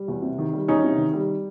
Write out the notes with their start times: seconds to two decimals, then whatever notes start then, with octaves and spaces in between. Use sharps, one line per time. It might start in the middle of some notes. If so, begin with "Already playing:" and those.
Already playing: G3
0.08 E2
0.22 C3
0.38 D#3
0.53 G3
0.68 E2 C#4 D#4
0.83 C3
0.98 D#3
1.14 G3